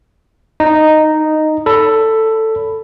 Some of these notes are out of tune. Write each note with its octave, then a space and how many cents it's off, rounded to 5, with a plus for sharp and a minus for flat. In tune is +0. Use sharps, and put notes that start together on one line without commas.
D#4 -5 D#5 +0
A4 +10 C#5 +40 B5 +0